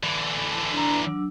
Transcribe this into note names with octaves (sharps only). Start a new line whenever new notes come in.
D3 E3
A5
D4 A#5
F#3 D4 E6